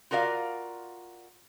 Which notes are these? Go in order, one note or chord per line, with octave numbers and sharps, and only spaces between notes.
F4 F#4 A#4 D5 F5